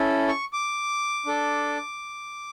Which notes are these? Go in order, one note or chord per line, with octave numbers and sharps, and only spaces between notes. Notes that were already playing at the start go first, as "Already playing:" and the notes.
Already playing: C#4 E4 A4
C#6
D6
D4 A4